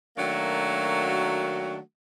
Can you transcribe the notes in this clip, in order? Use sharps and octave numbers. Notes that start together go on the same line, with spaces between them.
D#3 F#3 A3 A#3 D4 F#4